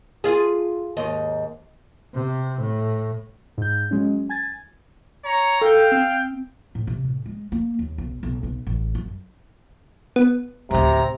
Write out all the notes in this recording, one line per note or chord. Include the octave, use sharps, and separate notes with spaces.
F4 G#4
D#2 G#2 D#5
C3
A2
G#2 G6
F#3 G#3 C#4
G#5 G#6 A6
C#5 A#5
A4 F5 G5
C4
A2
C3
A2
G#3
A#3
D#2
B1
B1
B1
A1
F#2
B3
A1 D2 C3 A#5